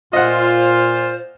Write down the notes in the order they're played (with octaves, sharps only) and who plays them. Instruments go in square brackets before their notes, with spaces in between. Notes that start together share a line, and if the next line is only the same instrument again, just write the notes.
[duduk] A#2 [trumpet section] F4 [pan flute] C5 [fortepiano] D#5 F#5